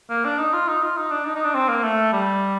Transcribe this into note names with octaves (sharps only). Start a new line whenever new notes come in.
A#3
D4
D#4
F4
D#4
F4
D#4
D4
D#4
D#4
D4
C4
A#3
A3
G3